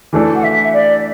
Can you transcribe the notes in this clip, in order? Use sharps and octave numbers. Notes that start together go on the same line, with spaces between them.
E3 A3 D4 A4
F#5
E5
D5